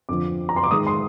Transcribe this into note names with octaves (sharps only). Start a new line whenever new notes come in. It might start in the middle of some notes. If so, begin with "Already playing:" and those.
F2 D3 F3 D6
A#5
C6
D6
G#2 D#3 D#6
C6